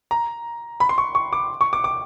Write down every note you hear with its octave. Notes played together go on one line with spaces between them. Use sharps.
A#5
B5
C6
C#6
C#6
D6
C#6
D6
D6